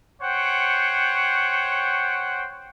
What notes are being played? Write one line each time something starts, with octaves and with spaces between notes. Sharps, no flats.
C5 C#5 F#5 G5